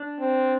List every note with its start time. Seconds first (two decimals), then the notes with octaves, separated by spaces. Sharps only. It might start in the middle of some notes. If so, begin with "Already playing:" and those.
Already playing: D4
0.19 C4